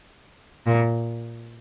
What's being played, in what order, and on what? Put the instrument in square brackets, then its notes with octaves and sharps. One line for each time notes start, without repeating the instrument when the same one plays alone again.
[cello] A#2